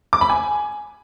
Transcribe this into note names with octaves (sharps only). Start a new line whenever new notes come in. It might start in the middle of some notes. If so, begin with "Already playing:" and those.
D6
B5
G#5